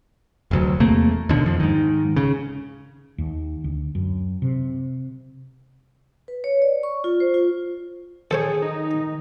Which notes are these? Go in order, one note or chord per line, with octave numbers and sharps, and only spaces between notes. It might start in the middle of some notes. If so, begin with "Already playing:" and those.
F1 D2 F#3
E2 C3 A3 A#3
D#2 B2 D3
F2 F3
G#2 D#3
C#3
D#2
D2
F#2
C3
B4
C#5
D5
C#6
F4
C5
F4
D#3 G#4 A4 C5 C#5
D#4